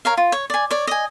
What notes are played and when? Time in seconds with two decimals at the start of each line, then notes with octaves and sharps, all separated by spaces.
0.05 A#4 C#5 F5
0.17 F4
0.32 C#5
0.50 D5 G#5
0.70 C#5 D5
0.87 D#5 G#5